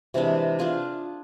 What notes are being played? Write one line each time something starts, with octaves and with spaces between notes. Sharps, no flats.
C3 E3 G#3 D4
D4 F4 G#4